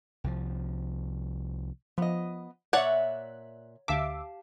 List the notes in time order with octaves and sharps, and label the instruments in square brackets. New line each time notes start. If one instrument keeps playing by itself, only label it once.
[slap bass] C2 F3
[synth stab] F3 [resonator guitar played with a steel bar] B3 D#5
[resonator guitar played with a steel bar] A#2 E5 [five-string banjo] C#5 D5 F#5 [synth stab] F#6
[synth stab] D2 E5 D6 [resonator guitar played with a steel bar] G4 F5 A5